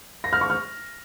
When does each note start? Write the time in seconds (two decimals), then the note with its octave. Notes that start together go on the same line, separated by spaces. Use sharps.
0.24 A#6
0.33 F6
0.41 C#6
0.50 F6